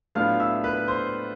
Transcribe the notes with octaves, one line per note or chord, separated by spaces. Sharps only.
A2 F#3 B3 D4 F4 F5 F6
E5 E6
B4 B5
C5 C6